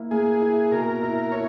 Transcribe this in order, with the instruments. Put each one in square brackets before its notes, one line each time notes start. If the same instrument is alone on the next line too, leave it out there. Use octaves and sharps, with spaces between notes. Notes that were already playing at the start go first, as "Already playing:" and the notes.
Already playing: [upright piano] A#3 E4
[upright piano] A#3 [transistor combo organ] G#4
[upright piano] E4
[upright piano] B2 [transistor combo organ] A#4
[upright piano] E4
[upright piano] E4 [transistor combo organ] C#5